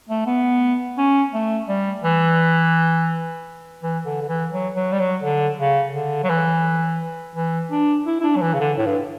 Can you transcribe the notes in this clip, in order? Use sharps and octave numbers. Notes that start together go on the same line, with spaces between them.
A3
B3
C#4
A3
G3
E3
E3
D3
D3
E3
F#3
F#3
G3
F#3
D3
C#3
D3
F#3
E3
E3
D4
E4
E4
D4
F#3
E3
C#3
D3
A2
G2